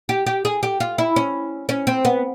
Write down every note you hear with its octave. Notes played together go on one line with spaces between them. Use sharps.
G4
G4
G#4
G4
F4
E4
C#4
C#4
C4
B3